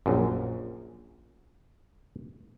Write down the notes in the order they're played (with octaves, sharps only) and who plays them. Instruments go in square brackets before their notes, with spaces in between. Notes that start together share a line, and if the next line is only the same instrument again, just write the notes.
[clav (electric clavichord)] A#1 F#2